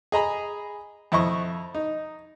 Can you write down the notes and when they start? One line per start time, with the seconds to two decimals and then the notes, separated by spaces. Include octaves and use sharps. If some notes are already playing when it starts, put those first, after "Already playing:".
0.12 G#4 D#5 A#5 B5
1.12 F2 E4 D#5 C#6
1.75 D#4